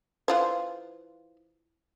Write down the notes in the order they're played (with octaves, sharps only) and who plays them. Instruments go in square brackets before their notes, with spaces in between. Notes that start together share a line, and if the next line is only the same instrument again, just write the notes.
[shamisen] E3 F4 C5